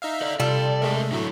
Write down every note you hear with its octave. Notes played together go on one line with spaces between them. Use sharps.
D#4 E5 F5
A4 D5
C3 G3 F4 A4 D5
G#3 A3 A#4 D#5 E5
A2 D3 F#3 A3 E4 A4